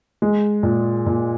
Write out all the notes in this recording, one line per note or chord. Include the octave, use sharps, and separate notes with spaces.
G#3
A#2
A#2